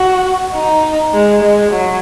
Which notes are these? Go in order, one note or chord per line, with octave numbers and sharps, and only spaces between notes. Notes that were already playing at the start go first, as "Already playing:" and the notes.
Already playing: F#4
D#4
G#3
G#3
F#3